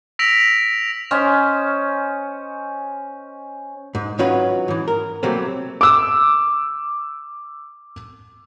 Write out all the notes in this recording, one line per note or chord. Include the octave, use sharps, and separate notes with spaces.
E6 A#6 B6 D7 F7
C#4 C5 D#5
G#2
D#3 F#3 C#4 F4 F#4 B4
G#2 E3
A#4
C3 F#3 G3 A3 A#3 C4
D6 E6